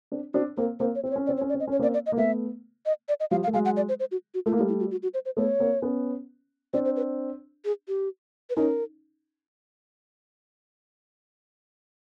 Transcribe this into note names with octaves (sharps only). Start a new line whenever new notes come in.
C4 D4
C4 D4 F#4
A#3 C4 A#4
A#3 C4 C5
C#5
C4 C5
C#5
C#4
C4 D5
C#5
C#4
D5
C4
D#5
C#4 C#5
A#3 C4 D5
D5
D#5
A#3
A3 B3 E5
D#5
D5
D#5
F3 G3 F5
F5
A3
F#3 G#3 F5
F#5
D5
C5
C5
F#4
F#4
A3 F4
A#3
G3 A3 E4
E4
F#4
F#4
F#4
C5
C5
A3 B3 C#5
A#3 C4
B3 C#4
C4 D4 D5
C5
B4
G#4
G4
B4
C#4 D#4 A#4